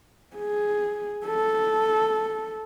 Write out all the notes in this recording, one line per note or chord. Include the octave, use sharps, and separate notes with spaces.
G#4
A4